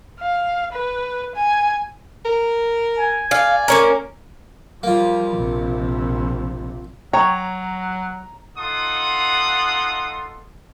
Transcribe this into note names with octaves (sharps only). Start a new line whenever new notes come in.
F5
B4
G#5
A#4
G#5
D5 F5
A#3 C#4 A#4
F3 G3 A#3 F4
A#1 C3
F#3 C#5 G5 A#5
D#4 F4 A4 F#5 C6 D#6